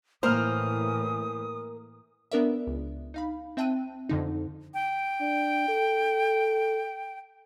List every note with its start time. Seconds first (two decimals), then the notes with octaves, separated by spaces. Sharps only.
0.23 A2 E3 A#3 A#4 C5 D#6 F6
2.32 B3 D4 A#4 D5 E5
2.67 C#2
3.14 D#4 F5 B5
3.57 C4 E5 G5 A5 F#6 D#7
4.09 F2 D3 D#4
4.74 G5
5.21 D4
5.68 A4